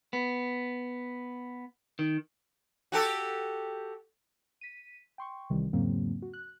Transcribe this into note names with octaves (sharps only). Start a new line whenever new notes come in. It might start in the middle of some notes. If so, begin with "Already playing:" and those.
B3
D#3
F#4 G4 A4
B6 D#7
G5 C6 C#6
C2 C3 D#3 E3 G3
E2 G#2 C#3 F#3 A#3 C4
F#4
F#6